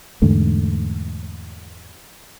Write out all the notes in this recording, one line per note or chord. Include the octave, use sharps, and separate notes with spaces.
E2 G#2 D3 A3